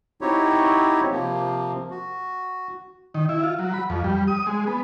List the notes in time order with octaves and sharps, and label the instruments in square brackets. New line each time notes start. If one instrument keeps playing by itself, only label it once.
[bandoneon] C4 D#4 E4 F#4 G4 C#5
C3 F3 A#3
F#4
[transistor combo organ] D#3
E4
F4
F#3
B5
F2
G3
D#6
G#3
B3